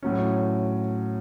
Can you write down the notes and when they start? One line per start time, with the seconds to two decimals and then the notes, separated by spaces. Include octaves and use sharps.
0.03 A2 F#3 C#4